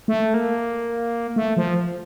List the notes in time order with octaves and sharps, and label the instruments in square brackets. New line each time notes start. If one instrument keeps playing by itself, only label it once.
[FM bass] A3
A#3
A3
F3